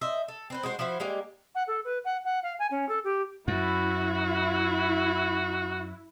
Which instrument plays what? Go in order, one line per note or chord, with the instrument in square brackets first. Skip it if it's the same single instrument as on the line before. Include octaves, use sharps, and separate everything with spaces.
[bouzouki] C5 D#5 E5
A4
C4 B4 C5
G#3 F#4 C5
F3 E4 F#4 C5
G3 G#3 A#3 G4
[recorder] F#5
A4
B4
F#5
F#5
F5
G#5
C#4
A4
G4
[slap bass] F#2 [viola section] E4 [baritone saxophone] F#4